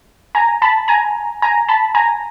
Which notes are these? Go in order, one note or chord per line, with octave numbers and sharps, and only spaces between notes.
G#5 A#5
A5 B5
G#5 A#5
G#5 A#5
A5 B5
G#5 A#5